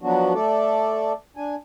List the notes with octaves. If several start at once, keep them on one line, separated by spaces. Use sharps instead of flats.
F3 F#3 B3 D4 F#4
A3 A4 D5
D4 G#5